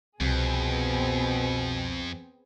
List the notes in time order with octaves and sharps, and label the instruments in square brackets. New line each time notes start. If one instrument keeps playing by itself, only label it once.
[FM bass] C2 [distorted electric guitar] F2 [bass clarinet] B2 [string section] B3 C4 G#4